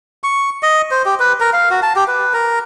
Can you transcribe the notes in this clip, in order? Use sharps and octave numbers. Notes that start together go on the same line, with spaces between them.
C#6
D#5
C5
G4
B4
A#4
F5
F#4
A5
G4
B4
A#4